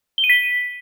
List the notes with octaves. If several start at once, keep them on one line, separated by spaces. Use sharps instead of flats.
G7
D#7
B6